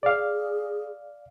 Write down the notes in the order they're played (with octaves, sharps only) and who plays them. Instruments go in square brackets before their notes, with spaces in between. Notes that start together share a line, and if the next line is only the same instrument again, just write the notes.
[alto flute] G#4 [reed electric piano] D5 F5